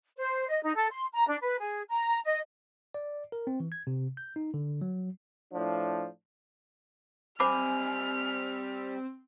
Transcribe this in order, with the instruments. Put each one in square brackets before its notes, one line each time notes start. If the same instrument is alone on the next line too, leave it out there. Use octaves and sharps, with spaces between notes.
[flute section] C5
D#5
D#4
A4
C6
A#5
D4
B4
G#4
A#5
D#5
[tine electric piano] D5
A#4
C4
E3
G#6
C3
G6
D#4
D3
F#3
[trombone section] A2 F3 D4
[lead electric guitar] G3 G#5 [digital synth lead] C4 [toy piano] C5 B5 D6 [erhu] F6